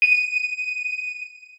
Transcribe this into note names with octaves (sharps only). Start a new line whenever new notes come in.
D#7